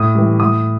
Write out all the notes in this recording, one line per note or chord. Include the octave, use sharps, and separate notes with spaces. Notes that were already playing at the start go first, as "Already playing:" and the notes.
Already playing: A2 D#6
E3 G3
A2 D#6